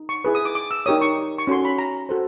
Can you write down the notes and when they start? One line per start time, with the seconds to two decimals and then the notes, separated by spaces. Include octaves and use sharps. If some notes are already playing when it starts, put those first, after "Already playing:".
Already playing: D#4
0.09 C#6
0.25 E4 G#4 B4
0.35 D#6
0.45 D6
0.55 D6
0.71 E6
0.86 D#4 G4 A#4 C#5 D#6
1.02 C#6
1.38 C#6
1.47 C#4 F#4 A4 C#5 C6
1.65 B5
1.78 A#5
2.09 F#4 A4 C5